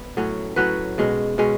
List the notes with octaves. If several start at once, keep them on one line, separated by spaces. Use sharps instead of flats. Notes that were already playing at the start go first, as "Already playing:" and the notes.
Already playing: B3
A2 F#3 C#4
A2 F#3 C#4 B4
B2 G#3 C#4
B2 G#3 C#4